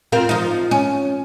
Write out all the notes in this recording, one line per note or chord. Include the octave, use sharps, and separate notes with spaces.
C4 F4 A#4
F3 D#4
C#4